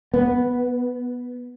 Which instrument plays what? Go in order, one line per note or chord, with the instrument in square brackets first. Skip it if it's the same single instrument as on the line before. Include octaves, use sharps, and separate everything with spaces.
[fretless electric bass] B3